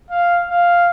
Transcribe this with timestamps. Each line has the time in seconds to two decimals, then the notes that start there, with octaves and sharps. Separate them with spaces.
0.10 F5
0.49 F5